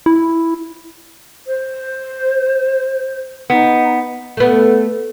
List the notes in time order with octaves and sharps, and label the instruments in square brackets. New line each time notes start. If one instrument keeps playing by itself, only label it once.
[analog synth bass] E4
[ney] C5
[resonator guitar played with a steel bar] B3 [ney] D#4
[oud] A3 B3